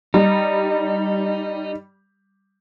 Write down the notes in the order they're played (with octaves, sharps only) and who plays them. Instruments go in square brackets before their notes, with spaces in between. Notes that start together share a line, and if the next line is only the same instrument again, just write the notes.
[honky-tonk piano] G3 [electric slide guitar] D#4